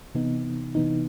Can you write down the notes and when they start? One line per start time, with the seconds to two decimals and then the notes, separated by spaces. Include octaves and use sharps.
0.15 C3 E3 B3 D#4
0.75 C3 E3 B3 D#4